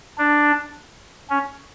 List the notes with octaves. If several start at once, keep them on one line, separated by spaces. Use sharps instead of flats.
D4
C#4